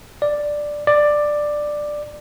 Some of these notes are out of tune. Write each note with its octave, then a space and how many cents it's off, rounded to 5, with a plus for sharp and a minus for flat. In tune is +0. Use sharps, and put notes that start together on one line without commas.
D5 +5
D5 +10